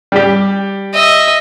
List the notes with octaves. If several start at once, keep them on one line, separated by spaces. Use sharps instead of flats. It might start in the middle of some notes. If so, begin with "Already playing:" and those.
G3 G4
D#5 E5